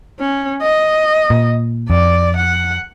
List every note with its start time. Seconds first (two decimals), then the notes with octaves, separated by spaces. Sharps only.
0.19 C#4
0.62 D#5
1.30 A#2
1.90 F2 D5
2.37 F#5